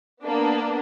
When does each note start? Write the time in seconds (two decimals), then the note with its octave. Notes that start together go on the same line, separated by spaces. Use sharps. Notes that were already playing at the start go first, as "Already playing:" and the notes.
0.24 A#3 B3 D4